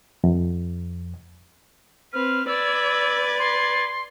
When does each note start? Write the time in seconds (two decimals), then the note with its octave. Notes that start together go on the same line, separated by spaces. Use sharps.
0.24 F2
2.13 C4 B4 F6
2.47 B4 D5 E6 G#6
3.39 C6